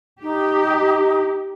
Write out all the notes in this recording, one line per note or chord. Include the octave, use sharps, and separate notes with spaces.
D#4 G4